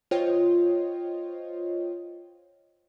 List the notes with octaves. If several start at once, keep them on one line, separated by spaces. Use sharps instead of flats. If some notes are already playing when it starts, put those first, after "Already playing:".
F4 C5 C#5 D#5 G5